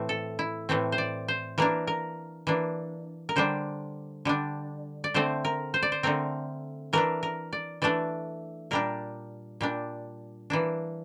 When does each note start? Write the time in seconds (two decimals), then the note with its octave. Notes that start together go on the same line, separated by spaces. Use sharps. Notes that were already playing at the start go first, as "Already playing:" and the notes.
Already playing: A2 E3 A3 C4
0.09 A4
0.39 E4
0.69 A2 E3 A3 C4
0.92 C5
0.98 D5
1.28 C5
1.58 E3 A#3 D4 A#4
1.87 A#4
2.47 E3 A#3 D4
3.29 A#4
3.36 D3 G3 D4 C5
4.25 D3 G3 D4
5.04 D5
5.14 D3 A3 C4 C5
5.45 A#4
5.74 C5
5.83 D5
5.92 C5
6.03 D3 A3 C4 A#4
6.93 E3 A3 D4 A#4
7.23 A#4
7.53 D5
7.82 E3 A3 D4 D5
8.71 A#2 G3 D4 A#4
9.61 A#2 G3 D4
10.50 E3 A#3 D4